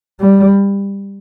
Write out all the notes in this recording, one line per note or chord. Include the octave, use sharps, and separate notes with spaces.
G3